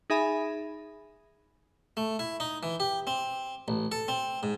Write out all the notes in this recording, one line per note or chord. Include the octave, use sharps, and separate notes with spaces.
D#4 G#4 E5 G#5 B5
A3
E4
D#4
E3
G4
C4
A1
A4
C4
G#2